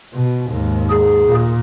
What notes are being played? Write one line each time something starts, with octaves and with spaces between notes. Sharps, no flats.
B2
D#2 G#2
G#4
A#2